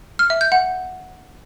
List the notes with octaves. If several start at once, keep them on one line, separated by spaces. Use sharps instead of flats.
F6
E5
G6
F#5